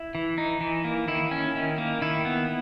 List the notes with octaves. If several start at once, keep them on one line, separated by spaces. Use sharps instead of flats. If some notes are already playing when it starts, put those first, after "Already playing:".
Already playing: E4
E3
D#4
E3
A#3
D#3 E4
C#4
D#3
A#3
D#3 E4
B3